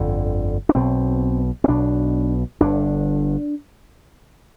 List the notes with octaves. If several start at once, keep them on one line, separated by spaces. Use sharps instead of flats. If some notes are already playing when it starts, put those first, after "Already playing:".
Already playing: G1 F2 D3
D4
B1 B2 C4
C4
B1 B2 D4
G1 G2 D3 D4